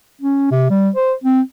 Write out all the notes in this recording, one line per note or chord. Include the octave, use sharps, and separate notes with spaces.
C#4
C3
G3
C5
C4